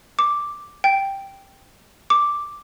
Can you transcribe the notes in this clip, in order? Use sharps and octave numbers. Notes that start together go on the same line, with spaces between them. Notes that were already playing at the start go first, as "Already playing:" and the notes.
D6
G5
D6